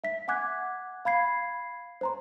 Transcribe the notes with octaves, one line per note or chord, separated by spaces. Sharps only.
E5 B6
F#5 G#5 D6 F#6 G#6
F5 B5 G#6 C7
C5 A#5 C6